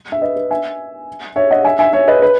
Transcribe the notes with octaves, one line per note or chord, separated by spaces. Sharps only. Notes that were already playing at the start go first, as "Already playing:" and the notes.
E5
B4 D#5
B4
E5 G#5
C#5 E5
D#5 F#5
E5 G#5
E5 G#5
C#5 E5
B4 D#5
B4